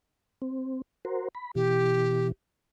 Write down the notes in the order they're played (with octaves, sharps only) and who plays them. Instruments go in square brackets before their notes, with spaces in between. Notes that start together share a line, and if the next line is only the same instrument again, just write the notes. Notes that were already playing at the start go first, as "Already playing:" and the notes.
[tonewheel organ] C4
F#4 A#4 C5
B5
[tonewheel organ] B2 E3 [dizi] G4